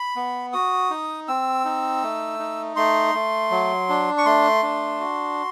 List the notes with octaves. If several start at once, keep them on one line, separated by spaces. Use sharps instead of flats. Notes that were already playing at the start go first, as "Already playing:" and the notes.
Already playing: B5
B3
F#4 D#6
D#4
C4 E6
D#4
A3
D#4
A3 C6
A3
F#3
D4
C#6
A3 C6
D4
F#4